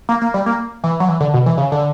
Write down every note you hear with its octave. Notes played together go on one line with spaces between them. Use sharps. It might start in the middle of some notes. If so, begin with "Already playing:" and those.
A#3
A#3
G3
A#3
E3
F#3
E3
D3
B2
E3
C#3
D3